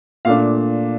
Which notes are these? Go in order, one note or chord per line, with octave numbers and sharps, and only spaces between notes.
A#2 A3 D4 F5